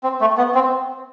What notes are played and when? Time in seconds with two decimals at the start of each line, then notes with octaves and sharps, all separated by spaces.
0.03 C4
0.21 A3
0.38 B3
0.55 C4